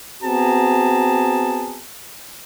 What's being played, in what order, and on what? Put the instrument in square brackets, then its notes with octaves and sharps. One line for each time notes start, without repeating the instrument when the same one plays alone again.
[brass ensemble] B3 C4 F#4 G#4 A5 A#5